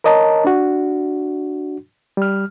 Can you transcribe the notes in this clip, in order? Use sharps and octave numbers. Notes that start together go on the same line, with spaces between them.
A#4 C#5 D#5 A5 A#5
D4 F#4
G3 F6